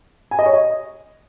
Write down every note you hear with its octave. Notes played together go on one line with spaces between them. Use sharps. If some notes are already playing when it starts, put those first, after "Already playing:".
G#5
D#5
C#5
D#5